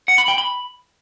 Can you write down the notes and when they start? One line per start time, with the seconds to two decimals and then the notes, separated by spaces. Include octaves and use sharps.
0.08 F#5
0.18 B5
0.28 G5
0.38 B5